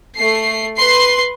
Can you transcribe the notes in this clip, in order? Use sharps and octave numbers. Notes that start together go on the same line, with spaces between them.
A3 C7
B4 C6 C7